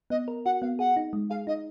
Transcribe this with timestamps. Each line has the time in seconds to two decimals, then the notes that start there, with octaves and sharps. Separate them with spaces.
0.10 B3 D#5
0.28 A#4
0.45 F#4 F#5
0.62 B3 F5
0.79 G#4 F#5
0.97 D#4
1.13 G#3
1.30 G#4 F5
1.47 D#4 D#5